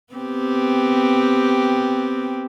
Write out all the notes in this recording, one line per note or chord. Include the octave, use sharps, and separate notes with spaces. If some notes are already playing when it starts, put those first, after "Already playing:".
B3 C4 G4